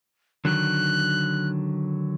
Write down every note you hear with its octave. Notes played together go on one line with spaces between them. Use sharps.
D3 D#3 F#3 F#6